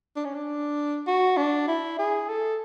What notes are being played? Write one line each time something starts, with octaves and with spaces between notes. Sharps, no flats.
D4
C#4
D4
F#4
D4
E4
G#4
A4